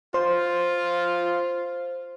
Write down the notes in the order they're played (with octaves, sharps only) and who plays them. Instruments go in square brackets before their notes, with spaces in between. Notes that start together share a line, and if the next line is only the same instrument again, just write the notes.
[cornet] F4 [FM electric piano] C5